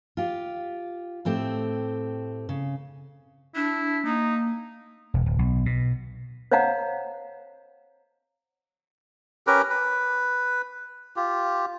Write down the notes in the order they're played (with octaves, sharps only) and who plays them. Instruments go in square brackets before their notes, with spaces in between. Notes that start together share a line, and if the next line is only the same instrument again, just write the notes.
[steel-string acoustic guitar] F4 G4
A2 A3 C4 G4
C#3
[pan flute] D4 [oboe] E4
[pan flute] A#3 [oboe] D#4
[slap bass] E1
D1
B1
B2
[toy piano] C5 C#5 D#5 F5 F#5 A#5
[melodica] C#4 G4 A#4 B4
B4
F4 G4